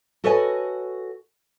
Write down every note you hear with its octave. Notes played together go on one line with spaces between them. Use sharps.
F#4 A4 B4 C#5 D#5 G#5